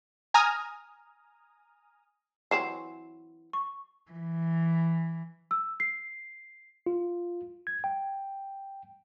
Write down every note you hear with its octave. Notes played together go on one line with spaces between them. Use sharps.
G#5 A#5 D#6 F6
E3 F#3 C4 C7 E7
C#6
E3
E6
C7
F4
G#6
G5